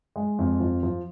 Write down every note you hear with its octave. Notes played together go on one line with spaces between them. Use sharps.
G#3
F2
F3
F3